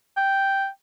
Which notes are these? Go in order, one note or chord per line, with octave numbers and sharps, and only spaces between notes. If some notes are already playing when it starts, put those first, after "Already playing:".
G5